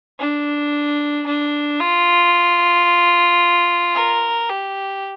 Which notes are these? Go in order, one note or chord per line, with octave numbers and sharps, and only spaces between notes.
D4
D4
F4
A#4
G4